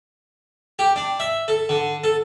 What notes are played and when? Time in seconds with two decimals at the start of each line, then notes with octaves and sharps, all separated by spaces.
0.79 G4
0.96 D4
1.20 E5
1.48 A4
1.69 D3
2.04 A4